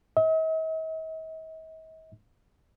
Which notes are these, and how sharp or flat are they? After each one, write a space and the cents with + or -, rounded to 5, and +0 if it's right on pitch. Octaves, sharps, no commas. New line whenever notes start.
D#5 +45